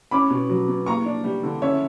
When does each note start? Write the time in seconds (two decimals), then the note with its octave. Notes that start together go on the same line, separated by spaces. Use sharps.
0.11 C#4 B5 D6
0.30 B2
0.49 F#3
0.68 B2
0.86 A#3 A#5 C#6
1.06 D4
1.24 G3
1.44 D3
1.62 C#4 C#5 E5